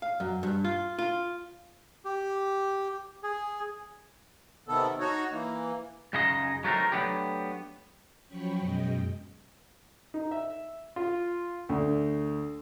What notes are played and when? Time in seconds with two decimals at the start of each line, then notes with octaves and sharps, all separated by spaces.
0.02 F5
0.20 F#2
0.43 G2
0.65 F4
0.99 F4
2.05 G4
3.23 G#4
4.68 C3 D#3 B3 A4
5.00 D#4 F#4 C#5
5.32 E3 A#3
6.13 C#2 F#2 C#3 G#3 D#4 D#5
6.64 F#3 G#3 A3 C4 D#4 A#4
6.92 F#3 G3 A3 B3 D4 G4
8.26 F3 F#3 C#4 G5 B5 C#6
8.60 F#2 B2 G#3 D#5 G5
10.14 D#4
10.31 E5
10.96 F4
11.69 D2